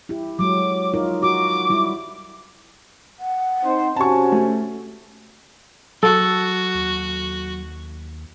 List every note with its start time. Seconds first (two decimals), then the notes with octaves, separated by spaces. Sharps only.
0.09 E4 G4
0.39 F#3 G#3 D6
0.94 D#4 F4 A#4
1.22 F#4 D6
1.70 G3 E4
3.19 F#5
3.64 C4 D#4 C5
3.96 C3 C#4 F#4 G#5 A5 C#6
4.32 A3
6.03 F#3 F#4 A4
6.75 D#2